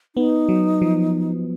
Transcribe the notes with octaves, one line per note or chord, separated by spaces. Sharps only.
B3 D#4
F#3
F3